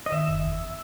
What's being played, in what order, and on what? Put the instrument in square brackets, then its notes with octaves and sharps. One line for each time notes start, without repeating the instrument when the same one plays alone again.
[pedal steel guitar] D#5
[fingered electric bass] D#3 [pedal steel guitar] E5
[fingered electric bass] F#1
E2